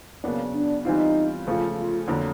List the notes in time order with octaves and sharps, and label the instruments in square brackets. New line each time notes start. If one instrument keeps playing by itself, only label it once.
[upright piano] C#3 F#3 B3 D4 [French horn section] A#3
[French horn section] D4
[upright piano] E3 G3 C4 F4 [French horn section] D#4
[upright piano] C#3 F3 A3 [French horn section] F4
[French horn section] F4
[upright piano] F2 D3 F#3 A#3